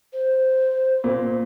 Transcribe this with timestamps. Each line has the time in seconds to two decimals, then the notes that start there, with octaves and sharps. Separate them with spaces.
0.13 C5
1.04 A#2